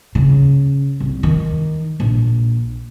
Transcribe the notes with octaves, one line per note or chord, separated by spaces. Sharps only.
C#3
C2
D#3
A#1